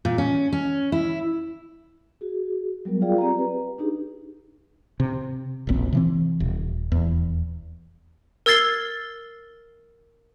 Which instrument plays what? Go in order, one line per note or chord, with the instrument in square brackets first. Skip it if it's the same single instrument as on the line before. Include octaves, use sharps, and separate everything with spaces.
[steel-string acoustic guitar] A#2
C#4
C#4
E4
[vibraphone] F#4 G#4
F#3 G3 B3 A#4
F4 G#4 D5 F5 G5
C4 G4 D5 A#5
B4
D4 D#4 G4 G#4
[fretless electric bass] C3
E1 A#1 C4
C3 E3 C4
D#1
D#1 E2
[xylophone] A#4 E6 G#6 A6 C7 G7